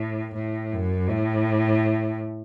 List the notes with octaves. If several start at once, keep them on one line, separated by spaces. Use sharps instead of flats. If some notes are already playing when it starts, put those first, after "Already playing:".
Already playing: A2
A2
F#2
A2